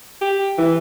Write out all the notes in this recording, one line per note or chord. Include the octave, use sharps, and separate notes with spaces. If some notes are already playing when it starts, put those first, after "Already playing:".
G4
E3